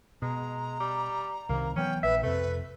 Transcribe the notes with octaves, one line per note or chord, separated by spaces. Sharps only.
B2 G#3 A#5
G3
C2 C3 D#3 A#3
E3 F#3 B3 C#4 G5
A#1 B4 E5
F2 C3 A3 B4